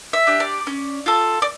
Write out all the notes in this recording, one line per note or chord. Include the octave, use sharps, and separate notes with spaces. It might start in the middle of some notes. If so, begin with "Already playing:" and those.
E5
D4 G4
D5
C#4
F4 A4
D5